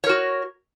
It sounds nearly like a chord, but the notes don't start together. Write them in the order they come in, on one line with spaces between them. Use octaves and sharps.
C#5 A#4 F#4